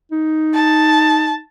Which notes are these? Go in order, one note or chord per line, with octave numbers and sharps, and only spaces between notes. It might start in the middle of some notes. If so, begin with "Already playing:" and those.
D#4
A5